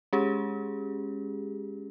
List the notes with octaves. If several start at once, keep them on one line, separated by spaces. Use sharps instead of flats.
G#3 C#4 G4 G#4